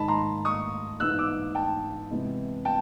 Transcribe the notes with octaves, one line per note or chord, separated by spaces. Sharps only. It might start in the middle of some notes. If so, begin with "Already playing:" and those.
Already playing: G#2 D#3 G#3 A5 B5
A#5 C6
C#6 D#6
G#2 E3 G#3 B3 E6 F#6
D6 E6
G5 A5
C3 E3 G#3 B3
G5 A5